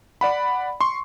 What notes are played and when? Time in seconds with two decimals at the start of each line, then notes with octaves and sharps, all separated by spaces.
0.21 D5 F#5 B5
0.81 C6 C#6